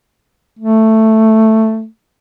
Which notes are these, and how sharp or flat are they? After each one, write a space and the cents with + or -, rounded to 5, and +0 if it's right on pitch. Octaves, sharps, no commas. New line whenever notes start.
A3 +5